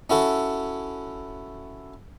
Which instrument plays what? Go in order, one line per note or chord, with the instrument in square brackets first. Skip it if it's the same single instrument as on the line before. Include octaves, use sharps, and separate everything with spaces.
[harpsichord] C#4 E4 F#4 A4